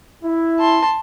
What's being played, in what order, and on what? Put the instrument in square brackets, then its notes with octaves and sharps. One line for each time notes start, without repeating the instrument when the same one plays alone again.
[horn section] E4
[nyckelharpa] A5 C6